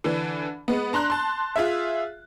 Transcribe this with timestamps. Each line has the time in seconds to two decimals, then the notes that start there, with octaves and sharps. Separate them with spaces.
0.04 D3 E3 D4
0.68 G#3 B3
0.93 D4 A#5 C6 F#6
1.10 A5 C6
1.56 F4 G#4 E5